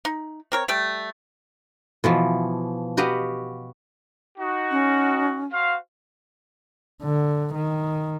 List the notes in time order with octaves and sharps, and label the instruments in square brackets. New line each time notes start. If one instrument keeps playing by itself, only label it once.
[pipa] D#4
C4 A#4 C#5
G3 A3 G5
[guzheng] B2 E3 F3
F#4 G4 B4 D#5 F5 F#5
[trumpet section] D#4 F#4
[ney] C#4
[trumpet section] F#4 C5 F5
[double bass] D3
D#3